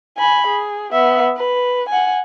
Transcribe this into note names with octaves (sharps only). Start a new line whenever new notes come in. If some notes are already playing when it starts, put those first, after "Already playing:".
G#5 B5
G#4
B3 E5
B4
F#5 G#5